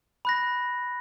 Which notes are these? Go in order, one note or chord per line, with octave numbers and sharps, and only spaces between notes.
B5 F#6 A#6